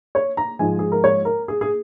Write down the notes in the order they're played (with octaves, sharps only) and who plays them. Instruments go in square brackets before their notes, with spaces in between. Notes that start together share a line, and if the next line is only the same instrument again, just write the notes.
[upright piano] C#5
A#5
G#2 F3 G#3 G#5
G#4
A#4
C#5
A#4
G#4
G#4